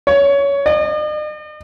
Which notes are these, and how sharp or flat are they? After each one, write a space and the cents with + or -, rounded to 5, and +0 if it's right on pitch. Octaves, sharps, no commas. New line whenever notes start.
C#5 +20
D#5 -45